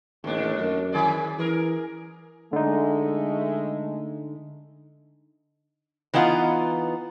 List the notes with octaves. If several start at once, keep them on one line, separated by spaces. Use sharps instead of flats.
A1 D#2 D4
F#2
D#3 G#4 D5
E3 G#4 A#4
D3 G#3 A3 D#4
E3 B3 D#4 F4 F#5